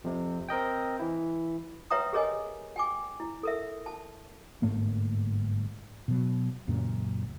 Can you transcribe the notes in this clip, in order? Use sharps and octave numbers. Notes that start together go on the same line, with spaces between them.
F2 C3
C4 A#4 D#5 G5
E3 E4
B4 C#5 E5 G5 A#5 D#6
G4 G#4 A#4 C#5 D#5 G#5
G5 G#5 D6
E4
A4 A#4 E5
A5
G1 G#2 A3 A#3
B2 F#3
C#2 F#2 A#2